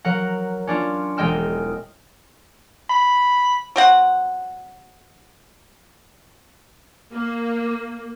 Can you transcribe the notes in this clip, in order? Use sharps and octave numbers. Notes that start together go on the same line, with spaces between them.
F#3 A#4 F#5
C#4 D4 F4
E1 G#3 D#5 G5 F6 E7
B5
F#3 C4 F#5
A#3